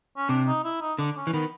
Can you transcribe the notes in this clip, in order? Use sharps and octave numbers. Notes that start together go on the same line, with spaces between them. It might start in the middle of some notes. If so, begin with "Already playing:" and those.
C#4
C3 D4
D#4
E4
D#4
D3 D4
C#4
E3
D#3 B3